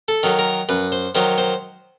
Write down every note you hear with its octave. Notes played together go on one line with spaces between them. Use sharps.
A4
D#3 F#3
A#4
F#2 B4
C5
D#3 F#3 C5
C5